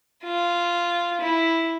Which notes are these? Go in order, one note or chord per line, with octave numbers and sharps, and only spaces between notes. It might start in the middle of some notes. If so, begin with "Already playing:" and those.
F4
E4